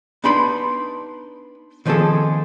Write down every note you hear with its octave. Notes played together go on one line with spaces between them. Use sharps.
B3 D4 D#4 B5 C6
D#3 F3 A#3 C4 G#4 A4